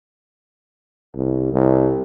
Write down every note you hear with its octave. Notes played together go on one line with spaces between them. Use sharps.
C2
C2